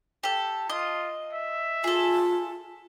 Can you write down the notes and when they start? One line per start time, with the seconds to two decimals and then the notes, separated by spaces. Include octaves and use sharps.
0.23 G4 A4
0.69 F4 D#5
1.33 E5
1.84 F4 G#4 A4